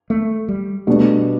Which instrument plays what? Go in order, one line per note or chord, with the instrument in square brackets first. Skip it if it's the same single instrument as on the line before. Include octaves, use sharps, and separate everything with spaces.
[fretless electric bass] A3
G3
[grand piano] B2 G3 D4 [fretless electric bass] A3